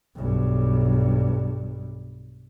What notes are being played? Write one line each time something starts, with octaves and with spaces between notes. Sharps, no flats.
B1 G2